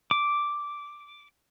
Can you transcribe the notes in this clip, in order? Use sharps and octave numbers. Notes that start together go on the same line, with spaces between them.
D6